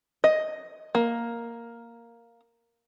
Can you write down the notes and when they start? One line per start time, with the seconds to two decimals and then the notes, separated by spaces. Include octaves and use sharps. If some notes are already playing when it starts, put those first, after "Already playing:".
0.24 D#5
0.95 A#3